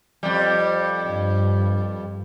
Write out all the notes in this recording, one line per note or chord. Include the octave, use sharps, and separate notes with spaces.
F2 G3
G2